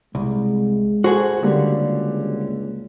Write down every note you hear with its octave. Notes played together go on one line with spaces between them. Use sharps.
C2 G#3
F#4 G#4 A4 C5 F#5
C#2 D3 G3 A#3 G4